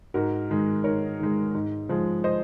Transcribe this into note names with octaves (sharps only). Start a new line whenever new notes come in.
G#2 F#4 A#4
D#3 G#3
G#2 A#4 C#5
D#3 G#3
G#2
F3 G#3
C5 D#5